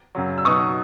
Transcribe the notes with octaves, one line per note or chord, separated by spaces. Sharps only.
F#2 C#3 F#3
E6
B2 F#3 B3 D#4 C#6 D#6